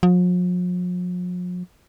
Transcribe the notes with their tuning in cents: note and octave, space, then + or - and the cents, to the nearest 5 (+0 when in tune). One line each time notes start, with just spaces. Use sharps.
F3 +45